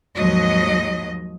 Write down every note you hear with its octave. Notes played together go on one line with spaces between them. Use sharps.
D#2 G#2 F3 F#3 D#5